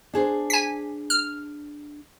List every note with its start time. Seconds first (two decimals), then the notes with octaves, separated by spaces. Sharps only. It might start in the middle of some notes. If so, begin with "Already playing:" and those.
0.13 D4 G#4 C5
0.50 G#5 B6
1.10 F6